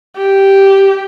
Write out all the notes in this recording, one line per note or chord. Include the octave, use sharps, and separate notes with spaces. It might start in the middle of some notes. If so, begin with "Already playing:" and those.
G4